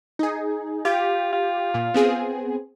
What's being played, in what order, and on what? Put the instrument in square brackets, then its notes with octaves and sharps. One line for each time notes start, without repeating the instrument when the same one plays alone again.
[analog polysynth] D#4 G#4
[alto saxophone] F4 [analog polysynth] G4
[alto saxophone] F4
[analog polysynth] A#2
B3 C4 G#4